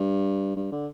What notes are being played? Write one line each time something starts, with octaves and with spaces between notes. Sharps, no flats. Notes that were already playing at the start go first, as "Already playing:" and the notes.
Already playing: G2
G2
D3